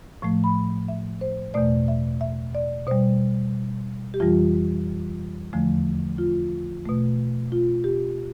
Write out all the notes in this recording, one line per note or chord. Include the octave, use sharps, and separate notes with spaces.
A2 F3 A3
B5
E5
C5
E2 B2 A3 D5
E5
E5
D5
B2 G3 C5
G4
F2 E3 G3 F4
E2 D3 F3 A3
F4
B2 A3
F4
G4